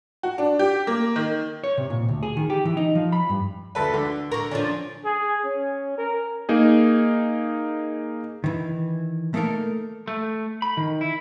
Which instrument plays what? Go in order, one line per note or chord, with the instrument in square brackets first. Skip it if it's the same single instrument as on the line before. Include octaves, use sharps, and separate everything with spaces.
[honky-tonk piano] F#4
D4
G4
A#3
D#3
[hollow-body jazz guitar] C#5
C3
A#2
D2
G#4
D#3
G4
E3
D#4
F3
B5
G2
[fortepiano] D2 A4 B4
D3
[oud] D3 A#4 [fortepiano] A#5 C#6
[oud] D3 F3 [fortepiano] C#4 D4
[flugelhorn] G#4
C#4
A#4
[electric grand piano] A#3 D#4 G#4
[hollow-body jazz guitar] D#3 E3
A3 A#3 D#4 A4 A#4
[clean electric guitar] A3
B5
D#3
E4